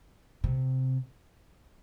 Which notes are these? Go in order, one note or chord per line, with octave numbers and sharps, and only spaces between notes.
C3